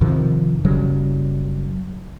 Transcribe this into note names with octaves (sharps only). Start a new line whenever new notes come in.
F2 C3 D#3 F3
F#1 C#3 F#3 G3